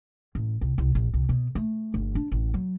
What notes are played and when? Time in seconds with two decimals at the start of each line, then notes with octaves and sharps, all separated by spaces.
0.35 A1
0.61 C2
0.78 C2
0.95 A#1
1.14 C2
1.29 B2
1.55 A3
1.94 G1
2.15 D4
2.32 A1
2.54 F#3